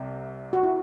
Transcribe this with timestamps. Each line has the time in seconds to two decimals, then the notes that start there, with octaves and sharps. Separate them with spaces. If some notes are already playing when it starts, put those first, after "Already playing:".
Already playing: C2 C3
0.53 F#4
0.63 E4